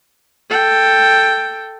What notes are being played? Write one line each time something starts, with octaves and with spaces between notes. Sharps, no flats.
A4 G5